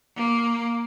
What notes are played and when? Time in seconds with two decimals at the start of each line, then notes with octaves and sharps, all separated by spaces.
0.16 A#3